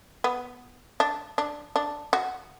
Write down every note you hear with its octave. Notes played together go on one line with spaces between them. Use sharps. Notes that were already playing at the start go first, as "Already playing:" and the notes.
B3
D4
D4
D4
F#4